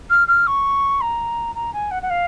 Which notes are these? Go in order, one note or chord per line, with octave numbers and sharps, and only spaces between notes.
F6
F6
C#6
A#5
A#5
G#5
F#5
F#5
F5